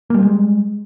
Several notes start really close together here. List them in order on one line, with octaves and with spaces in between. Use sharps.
A#3 G3 C4 G#3